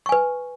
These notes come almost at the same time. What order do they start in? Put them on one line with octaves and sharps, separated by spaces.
C#6 G#5 B4